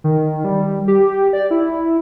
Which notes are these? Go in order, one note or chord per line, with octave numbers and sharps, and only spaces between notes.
D#3
G3
G4
D5
E4